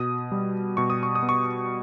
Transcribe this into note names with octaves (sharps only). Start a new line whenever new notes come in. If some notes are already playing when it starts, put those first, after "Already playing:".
Already playing: B2 D#6
G3
B2 C#6
D#6
C#6
D#6
B3
C#6